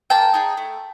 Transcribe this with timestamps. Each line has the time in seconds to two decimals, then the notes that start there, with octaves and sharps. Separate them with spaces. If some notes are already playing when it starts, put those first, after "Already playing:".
0.10 A#3 G5 A5
0.34 D#4 G#4
0.57 A3